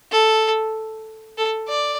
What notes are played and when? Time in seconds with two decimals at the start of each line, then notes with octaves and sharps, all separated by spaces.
0.11 A4
1.37 A4
1.68 D5